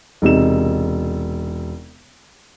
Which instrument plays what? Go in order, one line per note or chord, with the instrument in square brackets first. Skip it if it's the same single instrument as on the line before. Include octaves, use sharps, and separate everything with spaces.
[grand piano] E1 C3 D#4 E7